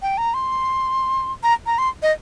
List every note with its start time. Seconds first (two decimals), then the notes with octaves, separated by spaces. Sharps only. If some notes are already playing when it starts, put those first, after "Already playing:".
0.02 G5
0.18 A#5
0.34 C6
1.43 A#5
1.66 A#5
1.78 C6
2.03 D#5